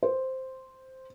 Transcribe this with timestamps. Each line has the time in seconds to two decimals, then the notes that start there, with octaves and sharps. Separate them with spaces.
0.03 C5